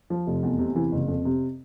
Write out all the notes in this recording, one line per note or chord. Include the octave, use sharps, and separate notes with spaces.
F3
F1
E2
C3
E3
F#1
F2
C3